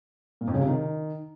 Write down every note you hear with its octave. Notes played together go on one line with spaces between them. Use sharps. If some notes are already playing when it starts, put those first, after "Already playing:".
A#2
F2
C#3
C3
D#3